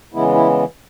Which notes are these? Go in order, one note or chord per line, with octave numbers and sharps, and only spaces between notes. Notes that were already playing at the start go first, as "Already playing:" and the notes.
C#3 E3 G#3 B3 E4
E4